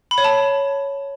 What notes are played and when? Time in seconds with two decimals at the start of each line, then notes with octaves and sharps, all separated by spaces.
0.11 B5
0.18 C#5
0.24 A5